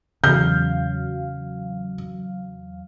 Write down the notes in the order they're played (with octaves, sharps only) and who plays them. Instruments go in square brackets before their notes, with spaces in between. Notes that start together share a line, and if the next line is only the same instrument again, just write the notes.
[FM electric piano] E2 F#3 F5 [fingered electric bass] C#3 [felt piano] G6